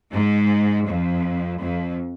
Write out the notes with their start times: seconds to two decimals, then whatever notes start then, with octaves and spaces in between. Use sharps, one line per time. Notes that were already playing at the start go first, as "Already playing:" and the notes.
0.12 G#2
0.86 F2
1.60 F2